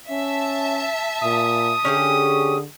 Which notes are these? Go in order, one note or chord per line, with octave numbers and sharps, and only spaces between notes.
C#4 E5 A5
A#2 D#6
D3 C#4 G4 G#4